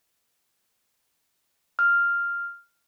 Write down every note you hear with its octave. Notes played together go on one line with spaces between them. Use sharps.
F6